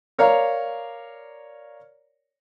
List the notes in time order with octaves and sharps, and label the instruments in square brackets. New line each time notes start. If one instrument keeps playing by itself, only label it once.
[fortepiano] A#4 C#5 D5 F5 A#5